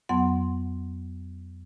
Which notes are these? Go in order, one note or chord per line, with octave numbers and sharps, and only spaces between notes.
F2 F#3 B3 F#5 C6